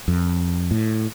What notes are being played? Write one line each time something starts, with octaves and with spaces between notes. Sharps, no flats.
F2
A2